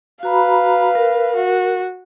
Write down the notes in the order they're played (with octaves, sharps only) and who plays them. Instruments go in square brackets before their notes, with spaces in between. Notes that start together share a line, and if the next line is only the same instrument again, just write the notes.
[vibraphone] F#4 A#5 B5 [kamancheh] B4 F5
[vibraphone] A#4
[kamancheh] F#4